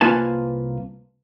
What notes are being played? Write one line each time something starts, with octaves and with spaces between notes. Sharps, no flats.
C2 A#3 F4 B4 G#5 A5